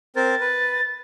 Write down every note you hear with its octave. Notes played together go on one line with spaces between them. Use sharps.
C4 A#4 C5 A6
B4